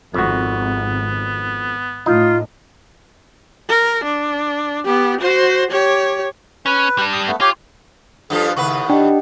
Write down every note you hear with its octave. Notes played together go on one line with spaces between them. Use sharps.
G#1 F2 B3 F#4
A2 D#4 F4
A#4
D4
B3 G4
F#4 C5
G4 C#5
C#4 B4
G3 D4
D#6
A3 B3
F4 G4 C#5
G2 F3 F4 A4
D#2 A2 C#3 B4 F#5 C#6
D4 G4 D#5 F#5 G5